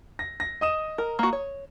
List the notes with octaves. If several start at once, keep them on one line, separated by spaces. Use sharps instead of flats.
A#6
A#6
D#5 D#6 E7
A#4
A#3 F#4
C#5